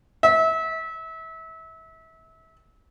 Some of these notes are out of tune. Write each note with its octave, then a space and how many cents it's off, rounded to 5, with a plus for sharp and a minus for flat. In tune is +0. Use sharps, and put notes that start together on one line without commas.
E5 -30